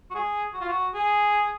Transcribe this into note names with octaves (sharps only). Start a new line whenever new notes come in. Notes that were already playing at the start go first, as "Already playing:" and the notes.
F#4
G#4
F#4
F4
F#4
G#4